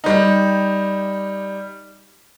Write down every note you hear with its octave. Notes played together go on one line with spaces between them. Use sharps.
G3 D#4